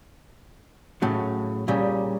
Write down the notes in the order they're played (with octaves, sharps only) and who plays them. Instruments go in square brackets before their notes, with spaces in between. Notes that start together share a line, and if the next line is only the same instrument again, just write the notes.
[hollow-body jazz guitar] A2 C#3 F#3
A#2 C#3 G3